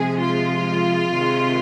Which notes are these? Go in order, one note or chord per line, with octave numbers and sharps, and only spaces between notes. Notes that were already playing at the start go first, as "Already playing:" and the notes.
Already playing: C3 F3 G#3 G#4
F4
C3 D#3 G#3